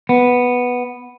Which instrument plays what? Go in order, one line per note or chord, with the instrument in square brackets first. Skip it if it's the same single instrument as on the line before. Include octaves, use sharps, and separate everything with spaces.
[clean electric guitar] B3